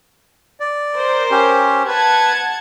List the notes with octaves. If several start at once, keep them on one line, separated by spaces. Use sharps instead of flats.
D5
A#4 C5
C#4 G4
B4 F#5 A5 G#6